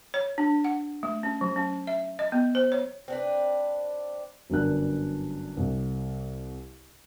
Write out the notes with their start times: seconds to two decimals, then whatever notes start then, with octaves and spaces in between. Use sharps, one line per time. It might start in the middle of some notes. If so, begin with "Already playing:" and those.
0.14 C#5
0.38 D4
0.64 F#5
1.03 A3
1.23 C#4
1.41 F#3
1.56 C#4
1.87 E5
2.19 D#5
2.32 B3
2.55 C5
2.72 C#5
3.08 C4 D4 B4
4.50 G1 F#2 D4 A#4 F#6
5.57 C2